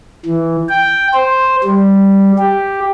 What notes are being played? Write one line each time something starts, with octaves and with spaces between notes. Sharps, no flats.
E3
G5
C5
G3
G4